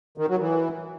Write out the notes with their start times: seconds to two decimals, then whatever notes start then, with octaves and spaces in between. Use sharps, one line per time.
0.18 D#3
0.28 F#3
0.39 E3